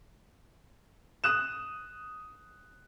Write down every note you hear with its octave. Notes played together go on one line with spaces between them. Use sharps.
D#6 F#6 E7